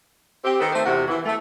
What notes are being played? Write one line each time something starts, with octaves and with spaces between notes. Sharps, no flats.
C4 G4
D#3 B3 A4
A3 C4 C5
E2 C3 F#4
E3
A3